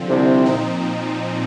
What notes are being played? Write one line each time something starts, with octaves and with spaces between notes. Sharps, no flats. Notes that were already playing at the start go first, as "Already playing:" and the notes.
Already playing: D3 F3 C4
C2 C3
A#2 F3 C4 D#4